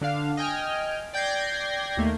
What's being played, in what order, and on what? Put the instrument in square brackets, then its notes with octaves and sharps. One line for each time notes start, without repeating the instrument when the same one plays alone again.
[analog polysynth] D3 D4 F5
D#5 G5 G#5 F6
D5 G5 G6 G#6 A#6 C7
D#2 A3 A#3